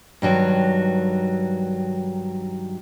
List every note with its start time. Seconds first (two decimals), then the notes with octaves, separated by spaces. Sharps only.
0.22 G2 D#3 F#3 G5